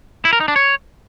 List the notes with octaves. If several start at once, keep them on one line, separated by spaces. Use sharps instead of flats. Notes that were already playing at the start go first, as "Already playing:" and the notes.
E4
A#4
D#4
D4
C#5